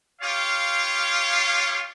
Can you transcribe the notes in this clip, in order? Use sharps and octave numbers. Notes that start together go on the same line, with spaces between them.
F4 G4 C#5 F5